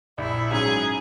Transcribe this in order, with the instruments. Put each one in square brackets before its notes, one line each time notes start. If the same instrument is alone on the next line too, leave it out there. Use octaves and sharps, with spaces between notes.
[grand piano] A#1 [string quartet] E4
[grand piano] G#2 F#3 C#4 [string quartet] G#4